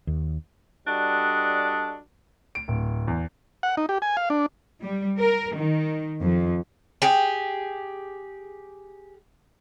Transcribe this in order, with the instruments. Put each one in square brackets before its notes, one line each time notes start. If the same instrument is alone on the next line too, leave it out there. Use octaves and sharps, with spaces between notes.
[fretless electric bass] D#2
[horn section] G3 D4 F#4 A4 D#5
[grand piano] D7
D1
E2
[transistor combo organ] F#5
D#4
G4
G#5
F5
D4
[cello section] G3
A#4
D#3
F2
[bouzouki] G4 G#4